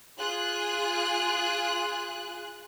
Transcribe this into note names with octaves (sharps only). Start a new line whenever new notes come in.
F4 G#4 F#6